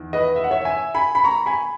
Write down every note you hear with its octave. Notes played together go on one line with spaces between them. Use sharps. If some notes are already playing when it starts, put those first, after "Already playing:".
Already playing: E2 D#3
B4 D#5
E5
F#5
C#5 E5
E5 G#5
G#5 B5
B5
A#5 C#6
G#5 B5